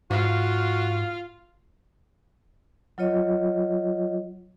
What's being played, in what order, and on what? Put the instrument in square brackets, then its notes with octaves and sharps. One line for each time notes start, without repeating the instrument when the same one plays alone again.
[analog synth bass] G#2 [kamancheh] F4 F5 [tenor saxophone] F#4
[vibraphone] F#3 F4 C#5 D#5